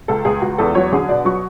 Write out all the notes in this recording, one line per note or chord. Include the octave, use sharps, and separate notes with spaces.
C#2 A4
C#2 G#4
C#2 F#4
E2 A4
F#3 C#5
D3 G#4
B2 D5
F#3 C#6